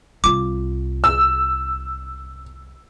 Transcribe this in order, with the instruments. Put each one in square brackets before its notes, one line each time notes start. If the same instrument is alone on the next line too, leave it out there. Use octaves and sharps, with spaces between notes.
[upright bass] C2 F4 [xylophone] D6
[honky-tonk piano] E6